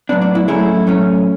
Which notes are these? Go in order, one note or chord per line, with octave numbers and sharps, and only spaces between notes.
A2 F#3 B3 D4
D4
E4
A2 F#3 A3 C#4 E4 G#4
A2 F#3 A3 C#4